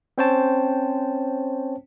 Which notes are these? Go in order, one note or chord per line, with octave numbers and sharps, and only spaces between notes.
C4 C#4 C5 C#5 G5 A5